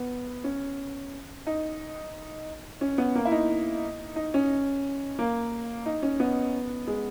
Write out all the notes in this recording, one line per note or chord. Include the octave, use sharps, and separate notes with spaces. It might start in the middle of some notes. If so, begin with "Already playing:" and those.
Already playing: B3
C#4
D#4
C#4
B3
A#3
E4
D#4
D#4
C#4
A#3
D#4
C#4
B3
G#3